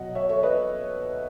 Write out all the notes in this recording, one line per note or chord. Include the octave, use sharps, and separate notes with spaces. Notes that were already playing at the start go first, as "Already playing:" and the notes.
Already playing: B2 F#3 D#5 F#5
C#5 E5
A4 C#5
B4 D#5